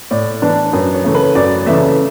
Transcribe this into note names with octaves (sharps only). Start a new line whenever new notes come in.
A2 D5
E3 B3 D4
F#2 B4
C#5
C#3 E3 A3
B4
F#2 D5
C#3 E3 A3 E5